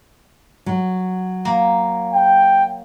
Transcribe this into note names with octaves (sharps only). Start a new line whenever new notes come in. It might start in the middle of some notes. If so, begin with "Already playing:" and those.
F#3
A#3
G5